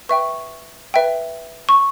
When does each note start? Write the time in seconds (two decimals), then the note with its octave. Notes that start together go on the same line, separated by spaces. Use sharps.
0.09 B4 E5 G5 C#6
0.94 B4 E5 G5
1.69 C#6